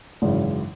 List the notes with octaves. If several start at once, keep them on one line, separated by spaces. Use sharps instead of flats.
G#1 F#2 C#3 E3